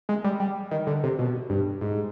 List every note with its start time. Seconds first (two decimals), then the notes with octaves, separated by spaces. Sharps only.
0.09 G#3
0.24 G3
0.40 G3
0.71 D#3
0.87 D3
1.03 C3
1.19 B2
1.50 G2
1.81 G#2